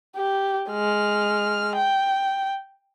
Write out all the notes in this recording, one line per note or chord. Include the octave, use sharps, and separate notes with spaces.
G4
G#3 F6
G5